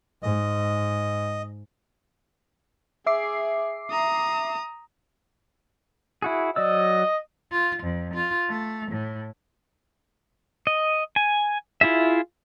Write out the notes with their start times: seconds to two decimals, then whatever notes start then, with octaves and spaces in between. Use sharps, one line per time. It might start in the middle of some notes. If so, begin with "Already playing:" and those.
0.23 G#2 D#5
3.07 G#4 E5 D6 C7
3.91 A#5 D#6
6.22 E4 F#4 G#4
6.56 F#3 D5 D#5 E6
7.51 F4
7.82 F2
8.14 F4
8.48 A3
8.91 A2
10.67 D#5
11.16 G#5
11.81 E4 F4 G#4 E5